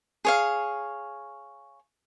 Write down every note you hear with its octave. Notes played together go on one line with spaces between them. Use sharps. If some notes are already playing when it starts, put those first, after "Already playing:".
G#4 C#5 F5